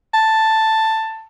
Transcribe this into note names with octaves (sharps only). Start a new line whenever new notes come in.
A5